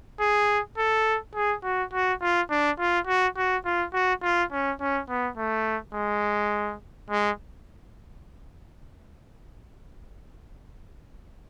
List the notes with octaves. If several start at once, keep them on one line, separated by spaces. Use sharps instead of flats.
G#4
A4
G#4
F#4
F#4
F4
D4
F4
F#4
F#4
F4
F#4
F4
C#4
C#4
B3
A3
G#3
G#3